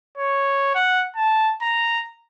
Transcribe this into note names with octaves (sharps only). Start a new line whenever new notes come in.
C#5
F#5
A5
A#5